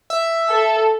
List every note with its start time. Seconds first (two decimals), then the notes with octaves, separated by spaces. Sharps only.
0.10 E5
0.49 A4